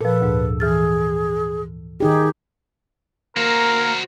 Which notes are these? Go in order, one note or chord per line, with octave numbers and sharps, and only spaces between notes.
A#2 F3 A4 B4
D2 G#2
E3 G#4 F6 A6
D#3 D#4 G4 G#4
A#3 F#4 A#4 C5